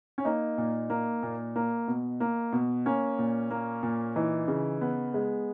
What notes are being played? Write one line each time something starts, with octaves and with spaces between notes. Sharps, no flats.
C#4
A#3 D#4
A#2
A#3
A#2
A#3
B2
A#3
B2
A#3 C#4
A#2
A#3
A#2
E3 D#4
C#3
B3
G#3